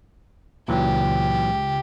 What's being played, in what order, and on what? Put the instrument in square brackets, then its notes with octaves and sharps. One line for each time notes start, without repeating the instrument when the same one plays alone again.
[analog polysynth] C#2 [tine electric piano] A#2 E3 F#3 [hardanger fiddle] G4